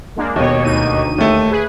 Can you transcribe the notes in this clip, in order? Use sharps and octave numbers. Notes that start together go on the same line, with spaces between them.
G#3 A#3 D4
D#2 B2 C#5 D#5
D2 D#4 D#7
D#2 A3
G#4 B4